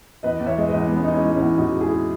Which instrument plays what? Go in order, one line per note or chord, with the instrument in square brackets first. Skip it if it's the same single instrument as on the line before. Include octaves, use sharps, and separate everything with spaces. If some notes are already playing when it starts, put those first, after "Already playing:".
[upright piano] E2 B4 D#5
E2
C#5 E5
G#3
B4 D#5
E2
B3
G#3
C#4
G#3 D#4
C#4 E4
G#3
C#4 E4
E2
E2 D#4 F#4
G#3
E4 G#4